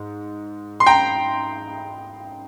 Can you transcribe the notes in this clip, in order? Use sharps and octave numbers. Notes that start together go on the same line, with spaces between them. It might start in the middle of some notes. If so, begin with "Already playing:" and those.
Already playing: G#2
C6
G5 A#5